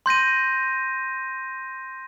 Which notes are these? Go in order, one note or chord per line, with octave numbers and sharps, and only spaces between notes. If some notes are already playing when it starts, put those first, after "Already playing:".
C6 G6 A#6 D#7